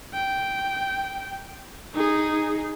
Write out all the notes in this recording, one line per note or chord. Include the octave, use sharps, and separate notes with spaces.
G5
D#4 G#4